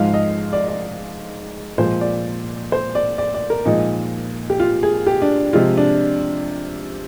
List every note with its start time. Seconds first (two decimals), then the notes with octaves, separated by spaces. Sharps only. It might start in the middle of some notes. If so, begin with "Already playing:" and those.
Already playing: G#2 F3 G#3 F5
0.14 D#5
0.53 D5
0.68 D5
1.78 A#2 F3 G#3 C5
2.01 D5
2.72 C5
2.95 D5
3.18 D5
3.34 D5
3.50 A#4
3.65 A#2 F3 G#3 D#4
4.50 G4
4.60 F4
4.83 G#4
5.07 G4
5.22 D4
5.53 C3 F3 G#3 F4
5.77 D4